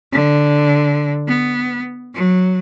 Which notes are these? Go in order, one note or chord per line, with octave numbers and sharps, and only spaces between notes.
D3
B3
F#3